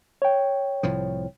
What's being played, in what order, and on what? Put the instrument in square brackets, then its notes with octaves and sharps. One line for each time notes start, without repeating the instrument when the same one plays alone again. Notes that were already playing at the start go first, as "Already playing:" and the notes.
[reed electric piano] C#5 G5
[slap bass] C2 A2 F3